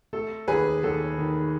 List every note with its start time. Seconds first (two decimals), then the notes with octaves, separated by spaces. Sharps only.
0.13 A3 A4
0.48 D#2 G#4 B4
0.83 D#2 A4
1.18 D#3